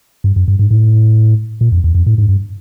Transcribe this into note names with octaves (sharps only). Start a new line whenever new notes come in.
G2
F#2
G2
G#2
A2
A#2
F2
E2
F2
A2
G#2
G2